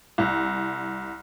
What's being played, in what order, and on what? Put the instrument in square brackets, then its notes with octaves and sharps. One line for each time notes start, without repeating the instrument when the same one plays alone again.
[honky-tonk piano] C2